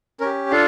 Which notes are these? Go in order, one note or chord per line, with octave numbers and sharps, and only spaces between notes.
C#4 G4 A#4
D4 F4 A4 F5